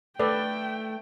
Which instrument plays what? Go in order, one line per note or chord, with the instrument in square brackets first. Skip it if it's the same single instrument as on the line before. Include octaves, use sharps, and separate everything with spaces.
[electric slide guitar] A3 [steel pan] A4 B4 D5 [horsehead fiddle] G5